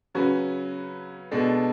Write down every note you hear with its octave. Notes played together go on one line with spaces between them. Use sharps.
C#3 F#3 C#4 F#4 B4
B2 G#3 D4 A4